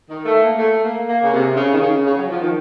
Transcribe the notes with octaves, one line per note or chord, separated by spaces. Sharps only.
D#3
A3
A#3
A3
A#3
A#3
C#3
C3
C#3
D#3
C#3
C#3
F#3
F3
D#3